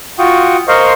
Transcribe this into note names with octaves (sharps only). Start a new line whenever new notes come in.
F4 F#4 G5 C#6 D#6
A#4 C5 D#5 F5 C6 C#6